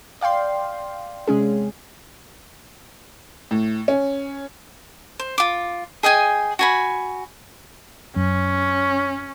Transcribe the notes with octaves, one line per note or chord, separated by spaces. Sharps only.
D5 F5 G5 C6
C3 G#3 C#4 G#4
A2
C#4
C5
F4 D6
G#4 D#5 G5 G#5
F#4 G#5 B5
F#2 C#4